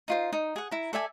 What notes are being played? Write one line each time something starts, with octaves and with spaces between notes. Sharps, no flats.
D#4 F4 C5
D#4
G#4 F#5
E4 A#5
A4 D5 E5 G#5